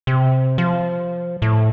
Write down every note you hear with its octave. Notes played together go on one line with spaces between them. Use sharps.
C3
F3
A2